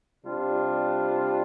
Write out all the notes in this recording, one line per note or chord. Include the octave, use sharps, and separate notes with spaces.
C3 G3 D4 F4